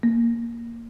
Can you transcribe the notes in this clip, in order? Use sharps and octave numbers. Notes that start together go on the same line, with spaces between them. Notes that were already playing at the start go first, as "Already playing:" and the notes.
A#3